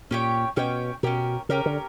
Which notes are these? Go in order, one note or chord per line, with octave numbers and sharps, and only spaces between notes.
A#2 C#4 G4 C#5 G5
B2 C#4 G4 C#5 G5
B2 C#4 G4 A#4
C#3 C#4 G4 A#4
D3